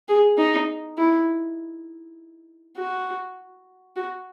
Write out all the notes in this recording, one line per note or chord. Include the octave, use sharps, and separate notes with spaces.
G#4
D#4
E4
F#4
F#4